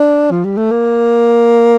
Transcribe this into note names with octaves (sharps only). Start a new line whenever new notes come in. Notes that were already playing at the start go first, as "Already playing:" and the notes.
Already playing: D4
F3
G3
A3
A#3